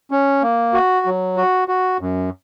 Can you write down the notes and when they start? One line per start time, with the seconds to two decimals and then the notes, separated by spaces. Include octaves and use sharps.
0.11 C#4
0.42 A#3
0.73 F#4
1.06 F#3
1.37 F#4
1.68 F#4
2.00 F#2